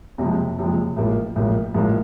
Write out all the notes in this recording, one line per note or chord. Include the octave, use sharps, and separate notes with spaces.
F#1 F2 C3 F3 G#3
F#1 F2 C3 F3 G#3
A1 G#2 F3 A#3
A1 G#2 F3 A#3
A1 G#2 F3 A#3